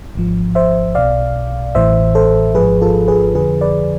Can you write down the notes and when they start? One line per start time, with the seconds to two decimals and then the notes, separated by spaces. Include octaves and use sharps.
0.15 G#1 G#2 F3
0.55 C5 E5
0.95 B1 B2 D5 F5
1.75 A1 A2 E3 C5 E5
2.15 A4 C5
2.55 G#1 G#2 F3 G#4 B4
2.82 F4 A4
3.08 G#4 B4
3.35 F2 D3 F3 G#4 B4
3.61 B4 D5